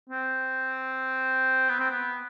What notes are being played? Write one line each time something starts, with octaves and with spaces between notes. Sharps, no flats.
C4
B3
C4
B3